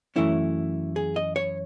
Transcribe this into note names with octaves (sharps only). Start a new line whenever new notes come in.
F#2 E3 A3 C#4 E4
G#4
D#5
C#5